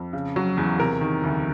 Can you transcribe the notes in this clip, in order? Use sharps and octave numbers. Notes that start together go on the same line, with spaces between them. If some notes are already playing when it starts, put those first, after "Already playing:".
Already playing: F2
C#3
F#3
E2
C3 A#4
D#3
D2